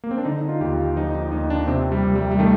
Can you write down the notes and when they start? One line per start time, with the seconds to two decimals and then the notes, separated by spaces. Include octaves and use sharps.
0.04 A#3
0.11 C4
0.18 D4
0.25 D3 D#4
0.42 D#4
0.49 F4
0.60 D#2 G4
0.73 F4
0.96 F3 D#4
1.15 D#4
1.32 D#2 D#4
1.50 D4
1.67 C3 C4
1.92 G3
2.04 C2
2.16 G3
2.31 G3
2.39 D#3 A3